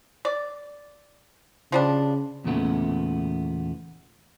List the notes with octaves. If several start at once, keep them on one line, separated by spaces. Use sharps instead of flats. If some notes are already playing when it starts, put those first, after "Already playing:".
D5
C#3 F3 G3 D4
E2 A#2 C#3 A3 B3